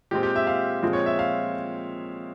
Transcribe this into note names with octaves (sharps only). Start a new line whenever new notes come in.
A#2 G#3 C4 G4
G4
E5
F5
A#2 F3 G#3 C4
C#5
E5
F5